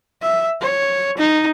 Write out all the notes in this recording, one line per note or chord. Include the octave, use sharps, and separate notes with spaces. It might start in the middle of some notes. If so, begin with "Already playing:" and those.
E5
C#5
D#4